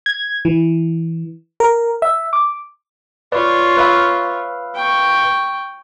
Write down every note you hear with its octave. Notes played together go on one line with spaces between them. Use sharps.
G#6
E3
A#4
E5
D6
F4 B4 C#5 D5
B4 E5 F5
G5 C#6